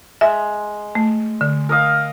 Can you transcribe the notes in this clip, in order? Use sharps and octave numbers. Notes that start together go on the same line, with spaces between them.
G#3 E5
A3
D3
A#4 D#5 F5